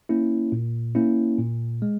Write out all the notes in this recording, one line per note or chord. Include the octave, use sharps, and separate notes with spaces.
A#3 C#4 E4
A#2
A#3 C#4 E4
A#2
G#3